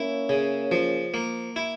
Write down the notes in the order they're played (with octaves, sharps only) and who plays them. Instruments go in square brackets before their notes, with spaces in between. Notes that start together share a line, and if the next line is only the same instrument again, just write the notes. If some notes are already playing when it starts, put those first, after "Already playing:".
Already playing: [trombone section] A#3 C#4 [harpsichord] E4
[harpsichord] C#3
F3
A#3
E4